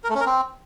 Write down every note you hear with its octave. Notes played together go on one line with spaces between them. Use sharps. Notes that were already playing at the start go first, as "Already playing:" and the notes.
A#4
A3
C#4
A#4
C4